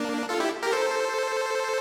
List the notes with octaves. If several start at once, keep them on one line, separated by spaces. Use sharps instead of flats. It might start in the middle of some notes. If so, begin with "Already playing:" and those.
Already playing: A#3 D4
F4 A4
E4 G4
G4 A#4
A4 C5